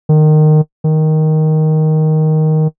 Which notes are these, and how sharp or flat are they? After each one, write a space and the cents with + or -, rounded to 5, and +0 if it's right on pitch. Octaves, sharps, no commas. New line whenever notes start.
D#3 -20
D#3 +5